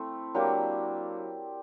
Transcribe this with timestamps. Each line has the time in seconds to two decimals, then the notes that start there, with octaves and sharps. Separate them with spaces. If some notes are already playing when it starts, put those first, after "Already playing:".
Already playing: A3 C4 E4
0.34 F#3 A#3 D4 G4